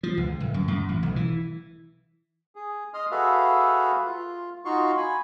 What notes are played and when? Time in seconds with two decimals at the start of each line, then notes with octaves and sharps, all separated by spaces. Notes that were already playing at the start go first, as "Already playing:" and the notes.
0.03 F3
0.17 C#2
0.40 D1
0.54 F#2
0.68 F#2
0.89 A1
1.03 B1
1.16 E3
2.56 G#4
2.94 D#5 C6 D#6 F6
3.11 F#4 G#4 A4 B4 E5 F5
4.06 F4
4.65 D#4 F4 F#4 C6 C#6
4.97 G#5 B5